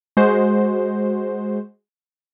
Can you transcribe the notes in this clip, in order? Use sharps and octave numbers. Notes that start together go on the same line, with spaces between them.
G#3 F#4 C5